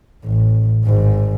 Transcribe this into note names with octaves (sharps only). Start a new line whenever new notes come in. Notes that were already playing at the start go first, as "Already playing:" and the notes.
A1
G#1 G#2